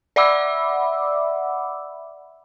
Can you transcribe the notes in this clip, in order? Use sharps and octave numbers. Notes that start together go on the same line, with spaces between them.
D5 E5 F#5 B5 D6 E6